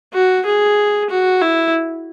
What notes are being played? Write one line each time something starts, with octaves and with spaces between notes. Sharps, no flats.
F#4
G#4
F#4
E4